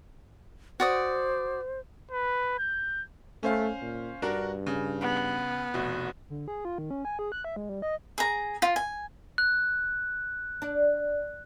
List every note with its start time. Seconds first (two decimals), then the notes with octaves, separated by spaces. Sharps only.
0.80 F#4 C5 D5 D#6
2.11 B4
2.59 G6
3.43 A3 C#4 C5 F5
3.82 A#2
4.22 G2 D4 F#4 A#4
4.67 C#3
5.01 B3
5.74 F1 B2
6.30 D3
6.48 G#4
6.65 F4
6.78 D#3
6.91 C#4
7.05 G#5
7.19 G#4
7.32 F#6
7.44 E5
7.56 G#3
7.69 G3
7.82 D#5
8.18 G#4 A#5
8.62 F4
8.76 G#5
9.38 F#6
10.62 D4